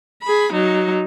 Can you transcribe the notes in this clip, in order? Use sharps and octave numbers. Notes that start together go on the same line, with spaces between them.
G#4 B5
F#3 D#4